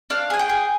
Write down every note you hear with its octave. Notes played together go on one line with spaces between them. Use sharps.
D4 F5
G#4 G#5
G5
G#4